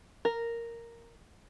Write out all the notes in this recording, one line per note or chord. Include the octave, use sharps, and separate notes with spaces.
A#4